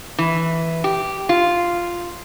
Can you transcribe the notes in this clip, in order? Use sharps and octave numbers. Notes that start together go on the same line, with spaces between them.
E3
G4
F4